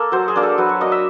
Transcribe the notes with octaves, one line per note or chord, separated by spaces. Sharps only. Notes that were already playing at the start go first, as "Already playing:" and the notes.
Already playing: A#3 A4
F#3 C5
G#4
A#3 D4
A4
F#3 B4
C#5
A#3 D4 D#5
E5